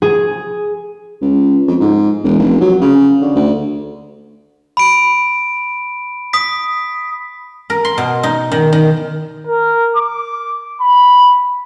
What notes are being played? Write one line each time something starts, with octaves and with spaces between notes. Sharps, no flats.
G#4
C#2
F2
G#2
E1
F1
F#3
C#3
D3
D2
B5 D7
D#6 B6
A#4
C6
B2
D#4
D#3
D#3
A#4
D6
B5